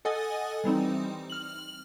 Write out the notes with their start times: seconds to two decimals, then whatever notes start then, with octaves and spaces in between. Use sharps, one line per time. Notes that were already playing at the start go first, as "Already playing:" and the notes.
0.05 A4 D#5 F#5 G#5 D#6 A6
0.64 E3 G3 C4 D#4
1.30 F6 F#7